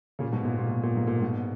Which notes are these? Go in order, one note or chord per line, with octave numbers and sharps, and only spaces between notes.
A#2 C#3
G#2 B2
A#2
A#2
B2
A#2
G#2
A#2
G#2 B2